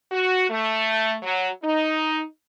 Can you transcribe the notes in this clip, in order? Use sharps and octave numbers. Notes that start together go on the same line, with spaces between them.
F#4
A3
F#3
D#4